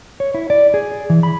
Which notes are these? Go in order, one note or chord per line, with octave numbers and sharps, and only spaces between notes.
C#5
E4
D5
G#4
E3
B5